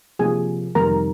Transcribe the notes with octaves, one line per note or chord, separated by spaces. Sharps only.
C3 F3 A#3 G#4 G#5
F2 C3 D#3 G3 A#4 A#5